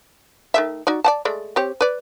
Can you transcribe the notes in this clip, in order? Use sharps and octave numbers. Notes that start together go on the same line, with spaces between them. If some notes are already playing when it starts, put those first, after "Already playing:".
D#3 A3 E5
D#4 F#4 D5
D5 F#5 A5
G#3 A3 D5
C4 G4 C#5
B4 D5